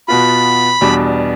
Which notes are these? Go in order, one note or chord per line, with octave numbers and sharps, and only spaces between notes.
B2 B3 F4 B5
E2 B2 G3 D4